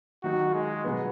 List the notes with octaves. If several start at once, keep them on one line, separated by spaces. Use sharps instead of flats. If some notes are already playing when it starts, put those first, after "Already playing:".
D#3 F#3 D#4 F#4
G#3
B2 F#3 B3